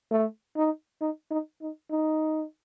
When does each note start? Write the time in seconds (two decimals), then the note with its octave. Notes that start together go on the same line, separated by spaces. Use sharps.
0.11 A3
0.56 D#4
1.01 D#4
1.31 D#4
1.61 D#4
1.91 D#4